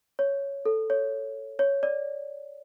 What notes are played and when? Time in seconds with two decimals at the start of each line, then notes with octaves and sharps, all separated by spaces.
0.19 C#5
0.66 A4
0.90 C#5
1.59 C#5
1.83 D5